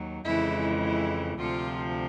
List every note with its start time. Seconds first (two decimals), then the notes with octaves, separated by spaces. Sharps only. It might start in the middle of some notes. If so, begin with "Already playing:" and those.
Already playing: D#2 F#3
0.24 F2 C#3 E3 G#3 E4
0.82 E4
1.39 D2 C3 F3 F4